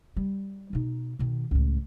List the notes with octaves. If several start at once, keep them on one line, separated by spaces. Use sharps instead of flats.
G3
B2 D#4
B2 D#3
C#2 A2